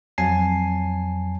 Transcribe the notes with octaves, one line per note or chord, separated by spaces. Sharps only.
F2 F#3 G#5 A5 C7